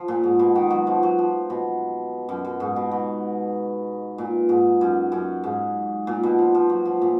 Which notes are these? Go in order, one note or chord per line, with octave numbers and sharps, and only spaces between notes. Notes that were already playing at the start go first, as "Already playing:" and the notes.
Already playing: F3
A#2
G#2
B2
D#3
F#3
F3
F#3
F3
B2
F#2
F#2
G#2
B2
B2
A#2
G#2
F#2
F#2
G#2
A#2
B2
F3
F3
F#3
F3
A#2